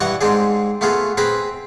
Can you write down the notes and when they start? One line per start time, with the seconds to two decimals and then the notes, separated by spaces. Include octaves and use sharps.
0.01 G2 E3 D#5 F#5 C#6
0.21 G#2 C4 D4 G#4
0.81 A3 B3 F4 G#4
1.17 C4 G#4 B4 A#5 B5